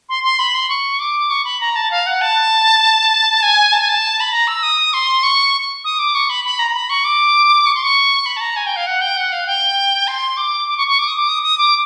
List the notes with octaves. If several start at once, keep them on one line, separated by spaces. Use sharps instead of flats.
C6
C6
B5
C6
C#6
D6
C#6
B5
A#5
A5
F5
F#5
A5
G#5
A5
G#5
A5
B5
A#5
E6
D#6
C6
C#6
D#6
D6
C#6
B5
B5
A#5
A#5
B5
C#6
D6
C#6
C6
C#6
B5
A5
A#5
G#5
G5
F5
F#5
G5
F#5
F5
G5
C6
D6
D6
C#6
C#6
D6
D#6
D6
D#6
D#6
D6